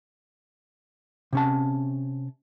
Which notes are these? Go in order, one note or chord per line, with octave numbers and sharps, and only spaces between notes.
C3 C#4 A5